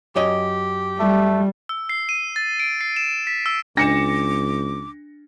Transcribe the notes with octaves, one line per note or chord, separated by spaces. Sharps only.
F#2 G4 C#5 D#5
G3 A3
E6
C7
D#7
A6
D7
C7
E7
B6
E6
C#2 D4 D6 A#6 C#7 E7